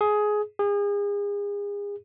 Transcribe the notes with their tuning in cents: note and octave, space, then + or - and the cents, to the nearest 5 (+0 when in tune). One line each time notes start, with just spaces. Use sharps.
G#4 +15
G#4 -35